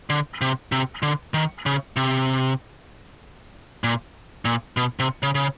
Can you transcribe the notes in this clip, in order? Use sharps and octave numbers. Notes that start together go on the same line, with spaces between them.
D3
C3
C3
D3
D#3
C#3
C3
A#2
A#2
B2
C3
C#3
C#3